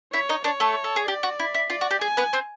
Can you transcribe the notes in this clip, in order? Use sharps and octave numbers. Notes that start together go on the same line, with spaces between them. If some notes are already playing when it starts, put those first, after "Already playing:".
E4 C#5 E5
D#4 D#5
D4 C#5 D5
A3 A4
A4
G#4
G4 D5
F#4
E4
E4
F4 D5
F#4
G4
G#4 G#5
B3 B4
C4 C5